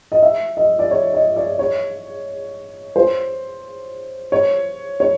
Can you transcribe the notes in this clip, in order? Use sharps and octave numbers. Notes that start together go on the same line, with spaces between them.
D#5
E5
D#5
D5
C#5
D#5
D5
C#5
C5
C#5
C#5